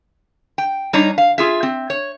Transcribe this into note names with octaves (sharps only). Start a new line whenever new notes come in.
G5
G3 D4 D#4 C#5 A#5
F5
F4 G#4 E5
C4
C#5